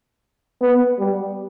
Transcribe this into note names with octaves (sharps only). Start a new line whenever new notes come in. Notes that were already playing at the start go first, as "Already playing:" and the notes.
B3
G3